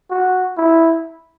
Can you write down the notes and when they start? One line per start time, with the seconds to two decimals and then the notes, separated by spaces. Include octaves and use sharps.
0.10 F#4
0.57 E4